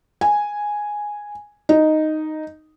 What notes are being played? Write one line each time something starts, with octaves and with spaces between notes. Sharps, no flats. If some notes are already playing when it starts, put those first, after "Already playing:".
G#5
D#4